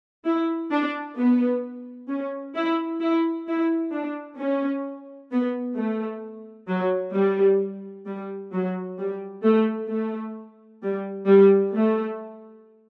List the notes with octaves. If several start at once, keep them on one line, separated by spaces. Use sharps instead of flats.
E4
D4
B3
C#4
E4
E4
E4
D4
C#4
B3
A3
F#3
G3
G3
F#3
G3
A3
A3
G3
G3
A3